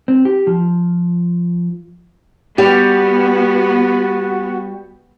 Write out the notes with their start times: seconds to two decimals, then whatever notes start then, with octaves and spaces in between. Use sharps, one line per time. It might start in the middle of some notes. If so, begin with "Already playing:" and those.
0.08 C4
0.25 G4
0.47 F3
2.58 G3 B3 F#4 G4